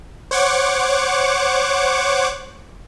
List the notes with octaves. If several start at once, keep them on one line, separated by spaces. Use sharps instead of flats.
C5 C#5 F#5 C#6 D6